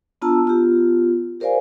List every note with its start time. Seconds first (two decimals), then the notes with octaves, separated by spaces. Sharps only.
0.22 B3 D4 F4 A5 A#5 E6
0.45 B3 F4 G4
1.40 G4 A#4 C5 D5 F5 G#5